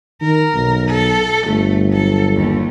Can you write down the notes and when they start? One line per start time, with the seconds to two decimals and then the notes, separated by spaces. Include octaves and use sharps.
0.22 D#3 A#4
0.54 B1
0.88 A4
1.46 G1 A3
1.90 F#3 A4
2.36 D#2